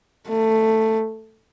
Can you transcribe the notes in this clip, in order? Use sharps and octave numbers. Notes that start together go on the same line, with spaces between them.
A3